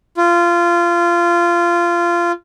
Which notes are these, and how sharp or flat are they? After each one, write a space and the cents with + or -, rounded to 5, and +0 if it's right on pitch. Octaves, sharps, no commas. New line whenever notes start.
F4 -20